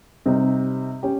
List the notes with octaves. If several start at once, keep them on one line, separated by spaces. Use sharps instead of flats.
C3 G3 C4 D#4
C#4 G4